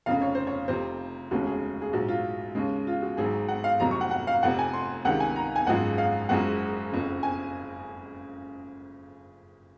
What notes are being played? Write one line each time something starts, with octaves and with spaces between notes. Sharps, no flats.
F1 F2 C#3 F5
C#5
C5
C#5
F1 F2 C3 C5
F1 D#2 C#3 G#3 F#4
G#4
G#4
A#1 G#2 F#3 F#4
F4
D#2 C#3 G#3
F4
F#4
G#1 G#2 F#3 G#4
F#5
F5
F1 F2 C3 F#3 A#5
C#6
F#5
F#5
F5
F1 F2 C3 F#5
G#5
C6
C#2 C3 D#3 F#5
G#5
A#5
G#5
G#1 F#2 F3 G#3 F#5
F5
F#1 F#2 F3 G#3 F#5
F#1 F2 C#3
G#5